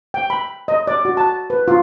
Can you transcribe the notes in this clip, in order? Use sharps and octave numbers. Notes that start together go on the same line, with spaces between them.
G5
B5
D#5
D5
F#4
A5
B4
F4